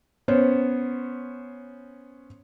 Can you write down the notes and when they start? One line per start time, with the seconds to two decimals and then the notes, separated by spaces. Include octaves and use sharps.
0.28 B3 C#4 C5 C#5